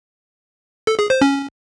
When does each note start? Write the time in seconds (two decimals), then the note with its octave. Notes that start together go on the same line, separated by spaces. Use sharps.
0.87 A4
0.99 G#4
1.10 C5
1.21 C#4